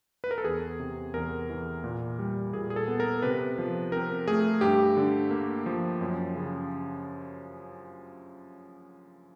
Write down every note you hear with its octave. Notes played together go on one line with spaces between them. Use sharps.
B4
A#4
A4
E2 G#4
C3
E2 A#4
E3
A#2
G3
A#2 G#4
G#4
A4
B3
A#4
C3 B4
F3
C4 A#4
A3 G#4
G2 G4
D3
A#3
F3
F#2
C#3